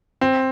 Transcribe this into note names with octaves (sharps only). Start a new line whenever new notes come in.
C4